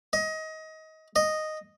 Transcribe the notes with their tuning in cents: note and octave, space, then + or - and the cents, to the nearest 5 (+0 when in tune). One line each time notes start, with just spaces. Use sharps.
D#5 +25
D#5 -5